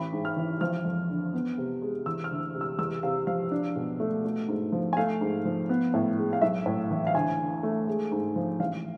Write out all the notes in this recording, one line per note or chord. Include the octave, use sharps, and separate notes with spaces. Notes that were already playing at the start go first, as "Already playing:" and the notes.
Already playing: A1 B5
G#2
F6
E3
F3 F6
F2
D3
B3
C3
G#3
E3 E6
F6
D2
C3
E6
E2 E6
C3 F5
F3 F5
D4
B2
A3
A3
G#2
F3
G#5
A3 F5
G#2
F3
B3
A2
G#3
F5
B1 E5
A2
E3
F5
D2 G#5
D3
A3
G#3
G#2
F3
A1 F5